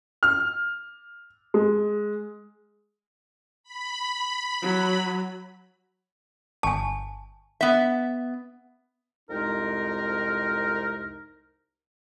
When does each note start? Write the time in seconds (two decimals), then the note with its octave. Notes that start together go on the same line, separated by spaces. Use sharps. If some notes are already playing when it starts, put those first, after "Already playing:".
0.23 F6
1.54 G#3
3.63 B5
4.62 F#3
6.63 G1 G#5 A5 C#6
7.61 B3 E5
9.30 C2 F2 G#3 D#4 A#4